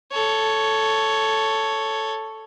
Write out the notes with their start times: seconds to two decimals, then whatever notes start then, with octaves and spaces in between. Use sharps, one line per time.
0.12 A4 C#5